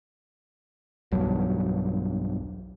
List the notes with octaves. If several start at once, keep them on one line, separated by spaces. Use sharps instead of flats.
B1 E2 G2 F#3